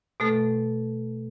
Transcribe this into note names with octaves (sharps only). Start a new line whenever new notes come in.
B2 A3 A4